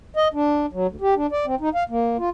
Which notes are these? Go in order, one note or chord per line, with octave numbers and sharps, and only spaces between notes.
D#5
D4
F#3
D2
G4
D4
D5
C4
D#4
F5
A#3
F4